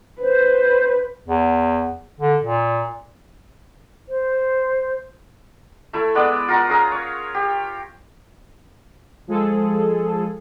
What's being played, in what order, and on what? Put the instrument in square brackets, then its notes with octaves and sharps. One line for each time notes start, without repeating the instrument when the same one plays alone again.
[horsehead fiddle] B4 [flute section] C5
[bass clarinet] E2
D3
A#2
[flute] C5
[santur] A3 E4 A4
G#3 B3 D5
F4 A#4 F#5
C#4 G#4 A#5
C#5
G4
[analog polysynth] F3 G#3 G#4 A4